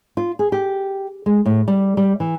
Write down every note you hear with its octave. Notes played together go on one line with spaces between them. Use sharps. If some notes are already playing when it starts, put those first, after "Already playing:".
F4
G#4
G4
G#3
A2
G3
G3
E3